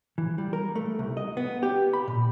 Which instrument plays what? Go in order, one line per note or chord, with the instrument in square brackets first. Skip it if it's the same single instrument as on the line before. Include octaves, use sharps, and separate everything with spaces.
[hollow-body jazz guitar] E3
G3
A#4
A3
C2
D#5
B3
G4
B5
A#2